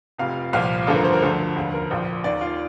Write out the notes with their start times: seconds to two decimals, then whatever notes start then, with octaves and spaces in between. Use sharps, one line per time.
0.18 F1 F2 C3 F5
0.53 C2 A#2 F3 F5
0.87 A1 G2 D3 F3 A4
0.96 A#4
1.04 C5
1.13 A#4
1.22 D2 D3 F3 A4
1.56 F1 D#2 D3 F3
1.74 A#4
1.90 A#1 A#2 F3 C5
2.24 D#2 D#3 D5
2.41 F4